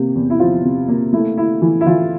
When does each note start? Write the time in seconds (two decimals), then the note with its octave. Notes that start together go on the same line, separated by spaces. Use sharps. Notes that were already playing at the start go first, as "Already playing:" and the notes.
Already playing: C3 A#3 G4
0.15 E2
0.30 E4
0.40 F3 F4
0.64 C3
0.88 A#3
1.13 A3 E4
1.37 E4
1.62 E3
1.81 E4
1.86 E3 F4